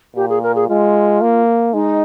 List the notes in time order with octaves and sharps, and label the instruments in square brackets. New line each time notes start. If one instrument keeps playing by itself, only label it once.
[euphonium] A#2 [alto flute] G4
[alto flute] G#4
A#4
G#4
[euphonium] G#3 [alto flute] F4
[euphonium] A#3
[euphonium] G#3 [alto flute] D#4